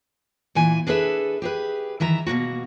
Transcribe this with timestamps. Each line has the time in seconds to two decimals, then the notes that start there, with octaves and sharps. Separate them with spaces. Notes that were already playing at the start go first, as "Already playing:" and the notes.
0.55 A#2 E3 G#5
0.87 D4 G#4 A4 B4 E5
1.42 G4 G#4 B4
2.00 D#3 E3 E5 A#5
2.26 B2 G#3 A#3 F#4